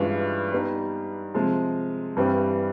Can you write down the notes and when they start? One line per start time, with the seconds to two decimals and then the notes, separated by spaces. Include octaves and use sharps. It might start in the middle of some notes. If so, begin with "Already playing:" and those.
Already playing: G2 E3 G#3 C#4 F4
0.52 G3 B3 D#4
1.35 C3 F3 G#3
2.17 G2 E3 G3 C4